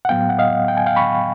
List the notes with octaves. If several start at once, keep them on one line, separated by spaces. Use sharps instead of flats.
F#5
A2 F#3 B3 F5 G5
F#5
D#5 F5
G5
G#5
F5 G5
B5 C#6